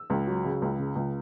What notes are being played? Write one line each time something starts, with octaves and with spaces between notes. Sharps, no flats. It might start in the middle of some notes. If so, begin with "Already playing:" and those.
Already playing: E6
C#2
F#3
C#3
C#2
C#3
C#2